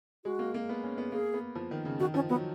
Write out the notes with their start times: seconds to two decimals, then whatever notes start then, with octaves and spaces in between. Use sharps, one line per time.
0.25 G#3 F#4
0.39 A#3
0.54 A#3
0.69 B3
0.84 C#4
0.98 B3
1.12 A#3 G#4
1.34 B3
1.55 F3
1.71 D#3
1.85 C#3
2.00 D#3 F#4
2.14 F3 C#4
2.29 F#3 B3